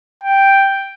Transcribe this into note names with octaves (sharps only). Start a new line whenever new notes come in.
G5